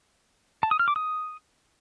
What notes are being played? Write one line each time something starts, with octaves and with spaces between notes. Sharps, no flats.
A5
D#6
F6
D6
D#6